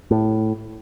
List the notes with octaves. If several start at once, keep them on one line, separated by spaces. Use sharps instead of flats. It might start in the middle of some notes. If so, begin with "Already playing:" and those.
A2